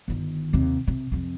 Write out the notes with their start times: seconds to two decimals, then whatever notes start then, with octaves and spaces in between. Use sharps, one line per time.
0.08 G1 D#3
0.53 D#2 C3
0.87 C3
1.12 F2 C3